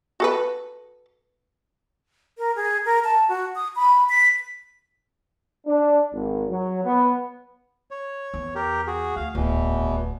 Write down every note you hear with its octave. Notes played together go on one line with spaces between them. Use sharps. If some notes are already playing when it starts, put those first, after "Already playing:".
F#4 A4 B4
A#4
G#4
A#4
A5
F#4
D#6
B5
B6
D4
G#1
F#3
B3
C#5
E2
G4 A#4
F#4 G#4
D2 F5
D1 E2 B2 E3